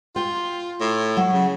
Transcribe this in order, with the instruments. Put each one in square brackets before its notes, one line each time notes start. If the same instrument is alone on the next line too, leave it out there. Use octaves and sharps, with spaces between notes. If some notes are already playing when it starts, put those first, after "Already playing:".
[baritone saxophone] F4 [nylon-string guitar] G5
[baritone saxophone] A2
[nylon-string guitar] F#3
[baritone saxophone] C#3